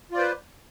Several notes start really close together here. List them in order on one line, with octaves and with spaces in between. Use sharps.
F4 D5 C5 B4